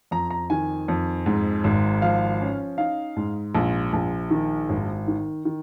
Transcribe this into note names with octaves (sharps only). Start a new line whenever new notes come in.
F2 A#5
A#5
D#3 G#5
F2
G#2
G#1
F3 F5
C#4
D#4 F5
G#2
A#1
A#1
D#3
G#1
D#3
D#3